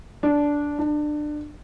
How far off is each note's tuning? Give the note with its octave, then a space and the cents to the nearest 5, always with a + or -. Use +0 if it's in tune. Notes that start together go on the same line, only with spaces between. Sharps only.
D4 -10
D4 +25